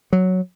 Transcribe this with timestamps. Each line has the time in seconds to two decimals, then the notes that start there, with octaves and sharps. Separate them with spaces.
0.13 F#3